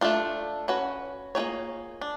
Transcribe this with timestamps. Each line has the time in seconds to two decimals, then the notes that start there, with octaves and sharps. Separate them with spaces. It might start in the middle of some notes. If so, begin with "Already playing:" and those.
0.01 A3 D4 F4
0.68 C#4 F#4 B4
1.35 A#3 D4 F4 G#4 C#5
2.01 D4